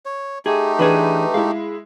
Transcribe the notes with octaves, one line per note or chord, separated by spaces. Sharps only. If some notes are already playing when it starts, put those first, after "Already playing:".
C#5
A3 D#4 G4 G#4
E3 D4 G#4 B4
G#3 E4 F5